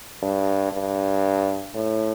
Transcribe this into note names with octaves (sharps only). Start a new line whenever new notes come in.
G2
G2
A2